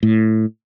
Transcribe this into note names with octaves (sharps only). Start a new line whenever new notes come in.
A2